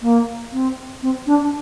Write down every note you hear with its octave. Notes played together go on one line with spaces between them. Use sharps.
A#3
C4
C4
D4